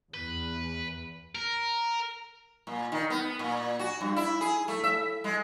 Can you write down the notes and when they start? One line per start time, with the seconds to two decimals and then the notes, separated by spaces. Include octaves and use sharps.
0.14 E2 B4
1.35 A#4
2.67 A#2
2.92 D#3
3.10 B3
3.39 A#2
3.79 F#4
4.01 G2
4.16 E4
4.41 G#4
4.68 A3
4.84 E5
5.24 G#3